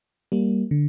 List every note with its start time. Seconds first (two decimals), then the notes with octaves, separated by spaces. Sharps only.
0.32 G3 A#3
0.71 D3